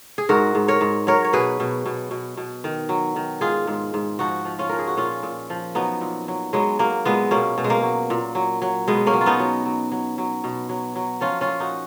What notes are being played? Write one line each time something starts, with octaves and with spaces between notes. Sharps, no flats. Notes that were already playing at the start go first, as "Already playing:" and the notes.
G#4
G#2 F#4 A#4
G#2
A#4 C#5
G#2
F#3 A#4 C#5
C#5
B2 G#4 B4
B2
B2
B2
B2
D#3
F#3
D#3
G#2 F4 G#4
G#2
G#2
F3 D#4 F#4
F3
C#4 F4
F3 A#4
G#4
F#4
A#2 C#4 F4
A#2
F3
F#3 B3 D#4
A#2
F#3
F#3 G#3 B3
F#3 A#3
A#2 G#3 B3
B2 A#3 C#4
B2
G#3
A#3
F#3
A#2
F#3
F#3
B2 G#3 B3
A#3 C#4
F#3
F4
B3 D#4
F#3
F#3
F#3
F#3
B2
F#3
F#3
F3 C#4 F4
C#4 F4
A#2
D#4 F#4